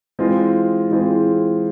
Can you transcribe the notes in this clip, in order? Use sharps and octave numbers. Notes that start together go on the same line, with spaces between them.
E3 G#3 C4 F4 G#4
E3 G#3 C4 F4 G#4